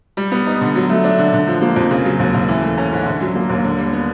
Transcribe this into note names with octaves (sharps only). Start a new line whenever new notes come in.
G3
B3
D#4
D3
F#3
A3
D4
D3
D3
F3
A#3
F2
C#3
F#3
D#2
D#2
E3
A3
C#4
G#2
D3
F#3
A#3
D#2
D3
G3
B3